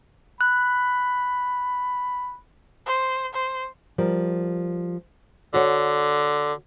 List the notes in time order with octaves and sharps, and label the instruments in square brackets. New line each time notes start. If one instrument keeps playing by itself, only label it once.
[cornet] B5 [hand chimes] F#6
[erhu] C5
C5
[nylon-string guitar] F3 G3 A#4
[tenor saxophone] D3 [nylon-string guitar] F#4 C#5